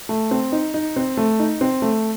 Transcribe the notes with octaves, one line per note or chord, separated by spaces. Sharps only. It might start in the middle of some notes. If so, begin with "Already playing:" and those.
A3
C4
D#4
D#4
C4
A3
D#4
C4
A3